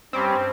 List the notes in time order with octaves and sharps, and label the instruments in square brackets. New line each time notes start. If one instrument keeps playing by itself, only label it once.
[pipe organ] G2 G3 C#4 G4 [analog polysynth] C4